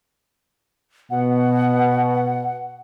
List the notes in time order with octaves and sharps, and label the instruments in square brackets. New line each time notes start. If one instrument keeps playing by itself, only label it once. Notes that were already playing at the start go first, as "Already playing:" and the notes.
[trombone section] B2 [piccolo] F#5